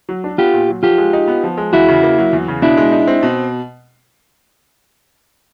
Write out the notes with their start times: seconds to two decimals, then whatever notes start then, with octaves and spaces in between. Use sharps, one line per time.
0.09 F#3
0.24 D4
0.38 B3 F4 G4
0.53 A#2
0.69 F#3
0.83 F3 F4 G4
0.98 G#3
1.13 D#4
1.28 B3
1.44 F3
1.57 G#3
1.73 E2 E4 F#4
1.89 C#3
2.03 A#3
2.18 F#3
2.33 E2
2.48 C#3
2.62 B2 D4 E4
2.77 G#3
2.92 D#4
3.07 C4
3.23 B2